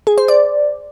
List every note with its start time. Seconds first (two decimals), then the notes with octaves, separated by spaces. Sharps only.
0.07 G#4
0.18 C5
0.28 D5